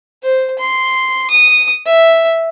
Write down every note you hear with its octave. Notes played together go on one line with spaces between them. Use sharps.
C5
C6
D#6
E5